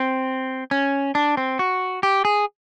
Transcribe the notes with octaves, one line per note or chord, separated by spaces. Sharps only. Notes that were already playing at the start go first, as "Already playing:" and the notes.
Already playing: C4
C#4
D4
C4
F#4
G4
G#4